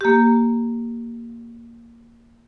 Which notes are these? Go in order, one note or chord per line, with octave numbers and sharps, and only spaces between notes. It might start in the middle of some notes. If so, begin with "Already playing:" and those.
A#3 G4